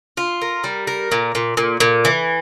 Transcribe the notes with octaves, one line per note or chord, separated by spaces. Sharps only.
F4
A#4
G3
A#4
A#2
A#2
A#2
A#2
E3